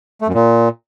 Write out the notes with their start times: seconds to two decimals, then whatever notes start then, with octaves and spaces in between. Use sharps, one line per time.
0.21 A3
0.28 F#2
0.34 A#2